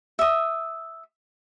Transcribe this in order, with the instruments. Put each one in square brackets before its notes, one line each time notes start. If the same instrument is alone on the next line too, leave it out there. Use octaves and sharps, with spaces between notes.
[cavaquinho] E5 D#6